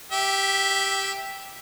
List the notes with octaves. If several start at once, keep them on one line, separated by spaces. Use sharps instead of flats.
G4 E5